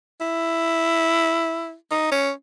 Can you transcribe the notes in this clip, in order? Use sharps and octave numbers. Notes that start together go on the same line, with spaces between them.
E4
D#4
C#4